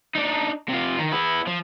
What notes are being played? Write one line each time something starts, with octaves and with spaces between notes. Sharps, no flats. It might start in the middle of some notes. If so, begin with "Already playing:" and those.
D4 D#4
C3 F4
D#3
B3 E4
F3